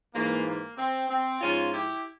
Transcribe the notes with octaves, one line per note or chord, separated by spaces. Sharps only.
G#2 E3 A#3
A#3
C4
C4
G#2 F3 C#4 F4
E4 G4